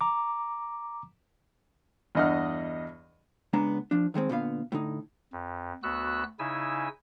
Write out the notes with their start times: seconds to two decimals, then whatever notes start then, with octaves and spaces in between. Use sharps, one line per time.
0.01 A#5 D6
2.15 E2 G2 D#5 F#5 F6
3.53 C#2 G#3 B3 D4 A#5
3.91 F3 D4
4.14 D#2 D#3 G#3 C4
4.29 A#2 D3 B3 F5
4.72 A2 D3 D#4
5.32 F2
5.83 D2 B3 F#4 E6 F#6
6.39 C#3 D#4 E4 G#5 E6